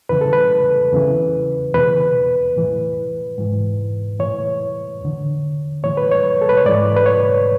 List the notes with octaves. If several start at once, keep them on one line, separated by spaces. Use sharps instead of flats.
E2 C#3 E3 B4
A4
B4
E2 C#3 E3
E2 B2 B4
A2 E3
G#2 E3
A2 E3 C#5
E2 D3
A2 E3 C#5
B4
C#5
A4
B4
C#5
G#2 E3 D5
B4
C#5